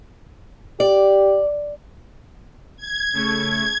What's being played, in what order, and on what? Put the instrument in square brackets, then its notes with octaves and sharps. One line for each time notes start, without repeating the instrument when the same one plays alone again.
[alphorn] G4 [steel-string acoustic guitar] D5
[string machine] G#6
[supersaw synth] C#3 A3 C#6